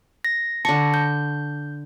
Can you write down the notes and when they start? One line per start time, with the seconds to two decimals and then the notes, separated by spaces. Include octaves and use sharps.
0.25 A#6
0.65 D3 A5 C#6 A#6 C#7
0.94 G6